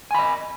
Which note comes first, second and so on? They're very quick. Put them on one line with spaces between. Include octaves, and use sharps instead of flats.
G#5 B5 D#5